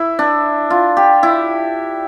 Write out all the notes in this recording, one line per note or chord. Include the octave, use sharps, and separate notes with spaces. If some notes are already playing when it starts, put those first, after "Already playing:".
Already playing: E4
D4
F4
G4
E4